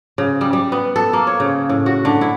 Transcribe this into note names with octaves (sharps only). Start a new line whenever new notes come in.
C#3
G3
G3
B3
A4
A#3
C#5
C#3
A2
F#4
D3
E4